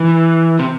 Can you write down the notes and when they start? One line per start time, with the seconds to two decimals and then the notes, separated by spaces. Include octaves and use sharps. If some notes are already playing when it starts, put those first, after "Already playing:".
Already playing: E3
0.59 C3